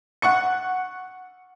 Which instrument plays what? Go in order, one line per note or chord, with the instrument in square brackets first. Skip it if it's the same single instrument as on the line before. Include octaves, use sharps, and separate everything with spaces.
[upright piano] F#5 C#6 C#7